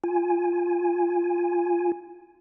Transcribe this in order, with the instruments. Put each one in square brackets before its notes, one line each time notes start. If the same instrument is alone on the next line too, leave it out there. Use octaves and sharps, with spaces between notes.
[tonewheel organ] F4 G#5